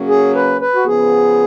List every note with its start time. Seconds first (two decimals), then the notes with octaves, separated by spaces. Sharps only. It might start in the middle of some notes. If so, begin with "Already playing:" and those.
Already playing: C#3 F#3 A#3 C#4
0.09 G#4
0.35 B4
0.61 B4
0.75 F#4
0.86 C#3 F3 B3 G#4